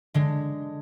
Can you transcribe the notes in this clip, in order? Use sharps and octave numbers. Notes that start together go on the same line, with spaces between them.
D3 G#3